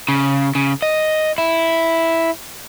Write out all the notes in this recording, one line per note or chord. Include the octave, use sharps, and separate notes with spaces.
C#3
C#3
D#5
E4